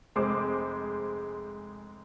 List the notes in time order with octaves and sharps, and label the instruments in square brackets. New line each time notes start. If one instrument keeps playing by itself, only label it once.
[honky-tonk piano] F1 G#3 G#4 C5 D6